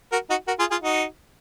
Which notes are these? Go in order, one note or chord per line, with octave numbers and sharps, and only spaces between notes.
F#4 A#4
D#4 F#4
F#4 A#4
F4 G#4
F4 G#4
D#4 F#4